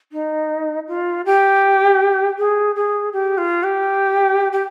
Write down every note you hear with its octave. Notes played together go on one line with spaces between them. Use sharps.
D#4
F4
G4
G#4
G#4
G4
F4
G4
G4